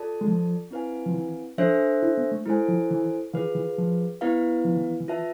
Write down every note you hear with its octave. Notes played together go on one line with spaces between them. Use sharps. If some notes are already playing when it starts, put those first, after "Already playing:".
Already playing: F4 A4 D5 A5
G#3
F3
C4 E4 B4 F5 G#5
F3
E3
F3 D4 A4 C5 E5
E4
B3
A3
G#3 E4 A4 C5 G#5
F3
E3
E3 F4 G#4 B4 F5
E3
F3
B3 E4 B4 F5
F3
E3
E3
F4 B4 E5 A5